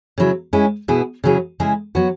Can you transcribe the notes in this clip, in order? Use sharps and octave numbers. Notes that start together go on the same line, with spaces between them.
C#3 F#3 E4
G#3 C#4 E4
B2 B3 E4 G#4
C#3 F#3 E4 G#4
C#3 G#3 E4 G#4
F#3 B3 F#4